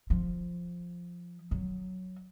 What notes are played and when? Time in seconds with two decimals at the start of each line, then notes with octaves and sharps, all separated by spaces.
0.10 F3
1.51 F#3